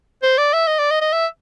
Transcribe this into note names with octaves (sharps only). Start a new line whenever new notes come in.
C5
D5
E5
D#5
D5
D#5
D#5
E5